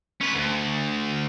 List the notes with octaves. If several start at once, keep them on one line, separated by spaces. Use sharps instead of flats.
C#4 B4
D2